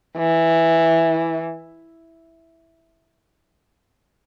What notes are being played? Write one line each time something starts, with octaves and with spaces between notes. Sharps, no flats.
E3